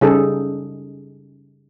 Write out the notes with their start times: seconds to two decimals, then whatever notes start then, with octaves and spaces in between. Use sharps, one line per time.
0.01 C#3 G3 D#4 G#4 A4